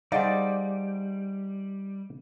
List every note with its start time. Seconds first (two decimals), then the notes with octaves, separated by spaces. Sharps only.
0.12 G3 D#4 G#4 C5 D5 F5 F#5